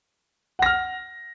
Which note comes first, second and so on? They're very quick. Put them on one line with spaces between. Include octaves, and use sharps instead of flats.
F#5 A#6 F6